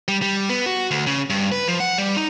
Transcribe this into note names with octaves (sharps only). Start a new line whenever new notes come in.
G3
G3
B3
F#4
D2
C#3
G2
B4
F3
F#5
G3
D#4